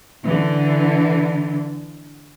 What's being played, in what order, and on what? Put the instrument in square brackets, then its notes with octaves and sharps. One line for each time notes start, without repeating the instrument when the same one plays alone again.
[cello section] D3 E3